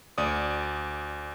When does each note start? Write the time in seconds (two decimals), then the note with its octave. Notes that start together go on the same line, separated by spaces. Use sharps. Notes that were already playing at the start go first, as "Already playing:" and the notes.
0.18 D2 D5 D#6